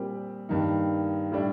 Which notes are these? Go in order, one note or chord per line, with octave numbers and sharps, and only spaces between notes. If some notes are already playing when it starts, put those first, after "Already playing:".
Already playing: A#2 G3 C4 G4
G2 D#3 A#3 D#4
A2 G3 D4